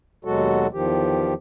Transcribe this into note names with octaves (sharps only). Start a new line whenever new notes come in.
D#2 B2 F#3 G#3 F#4 A4
E2 D#3 F3 G4